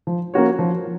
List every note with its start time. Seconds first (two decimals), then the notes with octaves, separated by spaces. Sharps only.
0.07 F3
0.34 A#3 C#4 F#4 C#5
0.59 F3